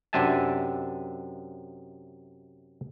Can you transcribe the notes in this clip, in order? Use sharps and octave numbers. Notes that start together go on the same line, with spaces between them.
F#2 C3 D4 E5 G#5 A5